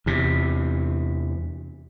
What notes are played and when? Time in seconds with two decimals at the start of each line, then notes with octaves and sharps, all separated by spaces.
0.06 E2 C3